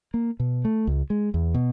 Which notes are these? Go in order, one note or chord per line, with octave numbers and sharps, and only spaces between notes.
A#3
B2
A3
C#2
G#3
E2
B2